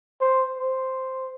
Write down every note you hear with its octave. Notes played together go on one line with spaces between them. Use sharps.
C5
C5